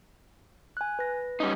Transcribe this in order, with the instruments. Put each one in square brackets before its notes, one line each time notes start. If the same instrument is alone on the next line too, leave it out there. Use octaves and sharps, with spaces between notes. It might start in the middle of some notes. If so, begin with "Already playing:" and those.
[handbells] G#5 F#6
B4 A#6
[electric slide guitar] G3 C#4 D#4